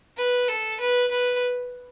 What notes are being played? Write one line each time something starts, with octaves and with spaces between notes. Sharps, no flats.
B4
A4
B4
B4